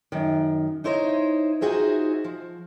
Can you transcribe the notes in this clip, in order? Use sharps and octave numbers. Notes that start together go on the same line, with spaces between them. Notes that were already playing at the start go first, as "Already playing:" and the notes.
F#2 D#3
D#4 E4 C5 C#5 D#5
D#4 F4 F#4 G#4 C5 E5
F3